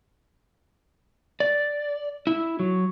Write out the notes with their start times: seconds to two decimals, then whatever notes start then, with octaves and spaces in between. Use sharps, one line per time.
1.40 D5
2.27 E4
2.59 F#3